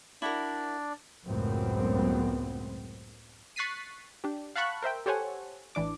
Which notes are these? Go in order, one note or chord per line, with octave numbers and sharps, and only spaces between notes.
D4 E4 F#4 A#4 D5
C#2 F#2 A2 B3 C4
C#6 F#6 A6 B6 C7 D#7
D4 G4
F5 F#5 A5 B5 C#6 F#6
A#4 C5 E5 G5
G4 A4 C5 C#5 F#5 G#5
A1 E3 D4 D6